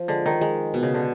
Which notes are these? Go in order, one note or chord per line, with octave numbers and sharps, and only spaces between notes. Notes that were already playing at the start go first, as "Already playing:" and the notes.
Already playing: F3
D3 G#3
D#3
G#3
B2
C#3
D3